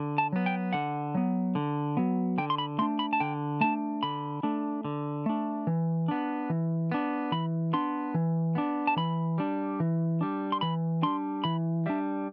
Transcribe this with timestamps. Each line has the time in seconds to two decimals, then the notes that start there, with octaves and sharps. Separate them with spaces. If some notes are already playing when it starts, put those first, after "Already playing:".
Already playing: D3
0.18 A5
0.33 F#3 B3
0.46 G5
0.73 D3 F#5
1.15 F#3 B3
1.55 D3
1.97 F#3 B3
2.38 D3 G5
2.50 C6
2.58 B5
2.79 A3 C6
2.82 D4
2.99 B5
3.13 A5
3.20 D3 G5
3.61 A3 D4 A5
4.03 D3 B5
4.43 A3 D4
4.84 D3
5.26 A3 D4
5.67 E3
6.08 B3 D4
6.50 E3
6.92 B3 D4
7.32 E3 B5
7.73 B3 D4 C6
8.14 E3
8.55 B3 D4
8.87 A5
8.97 E3 B5
9.38 G3 D4
9.80 E3
10.21 G3 D4
10.52 C6
10.61 E3 B5
11.03 G3 D4 C6
11.44 E3 B5
11.86 G3 D4 E5